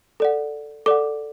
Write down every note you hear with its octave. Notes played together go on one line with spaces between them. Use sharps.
A4 D5 F#5
A4 D5 F#5 D6